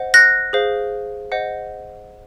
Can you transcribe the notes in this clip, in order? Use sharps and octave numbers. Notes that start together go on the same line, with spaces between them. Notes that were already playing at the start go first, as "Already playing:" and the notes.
Already playing: C5 D#5 F#5
F#6 A#6
G#4 C5 F5
C5 D#5 F#5